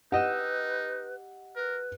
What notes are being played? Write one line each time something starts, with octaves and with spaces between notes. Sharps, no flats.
D#4 G4 B4 D#5 F#5 E6
A#4 B4